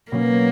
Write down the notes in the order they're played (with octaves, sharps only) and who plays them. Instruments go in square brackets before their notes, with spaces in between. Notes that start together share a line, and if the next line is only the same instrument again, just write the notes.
[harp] B2 F#3 C#4 [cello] A#3